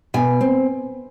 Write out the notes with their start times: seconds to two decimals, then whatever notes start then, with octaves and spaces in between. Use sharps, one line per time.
0.14 B2 G#5
0.41 C4